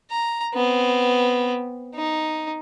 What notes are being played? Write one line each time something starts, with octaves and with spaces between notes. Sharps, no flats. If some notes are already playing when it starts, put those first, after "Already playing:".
A#5
B3 C4
D#4